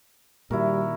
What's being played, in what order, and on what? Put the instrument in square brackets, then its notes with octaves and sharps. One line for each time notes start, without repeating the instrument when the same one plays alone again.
[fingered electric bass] A#2 D#3 [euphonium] G3 [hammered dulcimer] E4 F#4 A#4